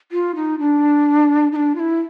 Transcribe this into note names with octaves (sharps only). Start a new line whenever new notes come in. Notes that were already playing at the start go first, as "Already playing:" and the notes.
F4
D#4
D4
D#4
D4
F4
E4